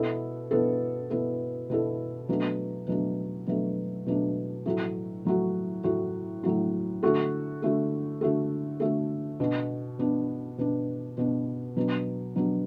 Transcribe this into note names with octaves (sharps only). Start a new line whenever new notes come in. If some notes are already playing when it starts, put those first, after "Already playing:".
Already playing: B2 B3 E4 A4
B2 B3 E4 A4
B2 B3 E4 A4
B2 B3 E4 A4
B2 F#3 A3 D4
B2 F#3 A3 D4
B2 F#3 A3 D4
B2 F#3 A3 D4
A2 F#3 A3 F#4
A2 F#3 A3 F#4
A2 F#3 A3 F#4
A2 F#3 A3 F#4
D3 A3 F#4 A4
D3 A3 F#4 A4
D3 A3 F#4 A4
D3 A3 F#4 A4
B2 B3 D4
B2 B3 D4
B2 B3 D4
B2 B3 D4
B2 F#3 B3 D4
B2 F#3 B3 D4